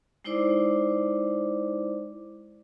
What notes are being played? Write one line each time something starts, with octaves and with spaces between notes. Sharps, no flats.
G#3 D#4 E4 C5 D5 D6